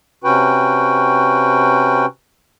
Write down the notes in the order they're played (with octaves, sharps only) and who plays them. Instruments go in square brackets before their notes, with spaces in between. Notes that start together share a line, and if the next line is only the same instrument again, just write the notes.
[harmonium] C3 C#4 F#4 B4 G5